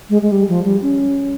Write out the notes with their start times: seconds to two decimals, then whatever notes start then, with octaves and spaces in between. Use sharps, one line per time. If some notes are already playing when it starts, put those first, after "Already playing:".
0.10 G#3
0.22 G#3
0.32 G3
0.49 F3
0.64 G3
0.82 C#4